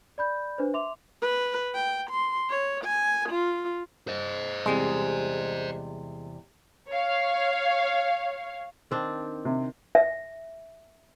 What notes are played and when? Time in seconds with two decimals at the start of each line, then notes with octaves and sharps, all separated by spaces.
0.18 D5 B5 G6
0.58 D4 B4 C5
0.74 E5 C6 D6 F7
1.22 B4
1.75 G5
2.10 C6
2.50 C#5
2.84 G#5
3.29 F4
4.08 C5 D#5
4.66 E2 C3 G3 G#3
6.89 C#5 F5
8.91 D#3 C4 D4
9.45 C3
9.95 E5